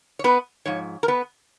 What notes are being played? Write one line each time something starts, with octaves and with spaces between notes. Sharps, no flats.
C#5
B3 B4
G#2 F3 C#5
A#4
B3 B4